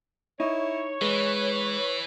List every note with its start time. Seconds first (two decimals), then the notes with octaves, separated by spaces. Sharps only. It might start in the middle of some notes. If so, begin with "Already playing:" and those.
0.40 D#4 E4 C#5
1.01 E3 G#3 B4